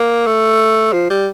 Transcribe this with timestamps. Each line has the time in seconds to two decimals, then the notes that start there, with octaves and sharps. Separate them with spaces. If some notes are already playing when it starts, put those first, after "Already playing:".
Already playing: A#3
0.26 A3
0.93 F3
1.10 G3